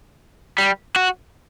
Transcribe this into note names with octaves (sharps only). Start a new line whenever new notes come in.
G3
F#4